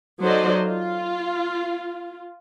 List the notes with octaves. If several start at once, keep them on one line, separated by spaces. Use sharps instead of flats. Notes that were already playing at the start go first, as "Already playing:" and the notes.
F#3 D#4 A4 C5 D5 D#5
F4